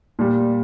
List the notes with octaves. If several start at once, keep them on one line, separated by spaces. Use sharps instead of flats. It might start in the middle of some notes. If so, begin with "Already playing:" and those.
A#2 G3